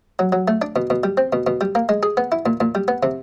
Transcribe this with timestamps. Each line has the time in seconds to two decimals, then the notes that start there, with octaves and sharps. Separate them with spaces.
0.19 F#3
0.32 F#3
0.48 A3
0.62 D4
0.76 B2
0.90 B2
1.04 G3
1.17 C4
1.33 B2
1.47 B2
1.61 G3
1.75 A#3
1.89 G#3
2.03 G#4
2.17 B3
2.32 E4
2.46 A#2
2.61 A#2
2.75 G3
2.88 B3
3.03 C3